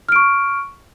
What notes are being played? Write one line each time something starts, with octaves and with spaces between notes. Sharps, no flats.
C#6 F6 D7